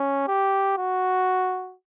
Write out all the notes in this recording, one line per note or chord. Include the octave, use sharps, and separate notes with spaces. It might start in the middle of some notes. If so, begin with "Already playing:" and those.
Already playing: C#4
G4
F#4